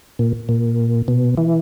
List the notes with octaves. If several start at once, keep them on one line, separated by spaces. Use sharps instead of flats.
A#2
A#2
B2
E3